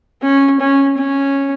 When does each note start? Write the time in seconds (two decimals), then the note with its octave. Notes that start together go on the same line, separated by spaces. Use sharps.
0.22 C#4
0.60 C#4
0.98 C#4